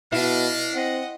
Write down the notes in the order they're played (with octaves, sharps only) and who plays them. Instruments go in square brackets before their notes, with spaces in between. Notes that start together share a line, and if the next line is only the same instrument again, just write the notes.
[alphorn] B2 [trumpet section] D4 F5 [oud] E4 [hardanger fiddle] D#5
[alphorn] C4 [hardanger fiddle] D#5 F#5